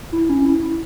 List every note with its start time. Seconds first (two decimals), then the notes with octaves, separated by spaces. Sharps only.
0.12 E4
0.29 C#4
0.45 E4
0.63 E4